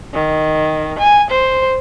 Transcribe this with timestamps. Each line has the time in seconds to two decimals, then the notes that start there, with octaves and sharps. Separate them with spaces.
0.13 D#3
0.99 G#5
1.31 C5